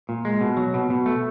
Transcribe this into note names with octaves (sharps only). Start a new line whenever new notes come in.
A#2
G#3
B2
F#3
B2
B2
A3